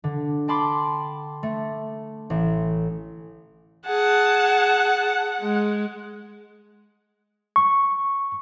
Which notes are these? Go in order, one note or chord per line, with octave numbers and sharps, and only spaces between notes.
D3
G5 A5 B5 C6 D6
A3
A1
G#4 F#5 A5
G#3
C#6